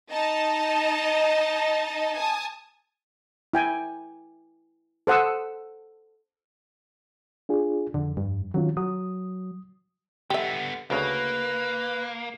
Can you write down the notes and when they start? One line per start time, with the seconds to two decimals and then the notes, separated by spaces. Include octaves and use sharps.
0.11 D#4 D#5 A5
2.16 G#5 A5 D#6
3.53 E4 G5 G#5
5.07 A4 C5 F#5 D#6 E6
7.49 D4 F4 G#4
7.94 F2 D3
8.17 G2
8.54 D#3 F#3 C#4 F4
8.77 F#3 D#6
10.30 D3 B3 G4 E5
10.90 D2 C#3 A#3 B4